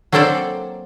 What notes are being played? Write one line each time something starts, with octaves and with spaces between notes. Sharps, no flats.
F#3 A#3 C4 A4 C5 D5